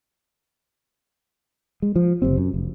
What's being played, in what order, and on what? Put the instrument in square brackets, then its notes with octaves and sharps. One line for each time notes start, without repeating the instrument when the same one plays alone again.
[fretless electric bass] G#3
F3
F#1 C3 C4
F#2
F1